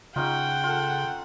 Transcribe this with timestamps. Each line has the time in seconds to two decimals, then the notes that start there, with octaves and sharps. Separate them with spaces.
0.16 C#3 C#4 D#4 F4 F#5 G5
0.64 F4 A4